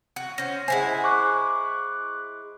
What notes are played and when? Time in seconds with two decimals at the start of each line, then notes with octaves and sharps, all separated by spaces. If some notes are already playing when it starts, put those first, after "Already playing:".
0.16 F#4
0.38 C#4 C5 A#6
0.68 G#3 E4 C5 F#5 G#5
1.04 C#6 D6 F#6